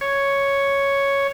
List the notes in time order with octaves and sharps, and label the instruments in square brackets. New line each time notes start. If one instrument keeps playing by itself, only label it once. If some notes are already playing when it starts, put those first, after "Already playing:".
[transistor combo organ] C#5